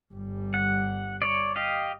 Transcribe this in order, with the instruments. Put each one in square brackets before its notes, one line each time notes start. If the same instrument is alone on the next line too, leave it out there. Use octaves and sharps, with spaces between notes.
[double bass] G1 G3
[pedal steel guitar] F#5
C#5 D5
G4 D#5 F5